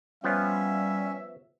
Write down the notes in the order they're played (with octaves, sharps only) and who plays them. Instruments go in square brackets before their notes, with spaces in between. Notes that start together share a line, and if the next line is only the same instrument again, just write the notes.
[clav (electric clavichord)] F3 B3 [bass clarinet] G3 [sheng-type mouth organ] C#4 [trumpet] E5